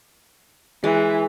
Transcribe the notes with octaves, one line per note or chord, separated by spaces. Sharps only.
E3 G#3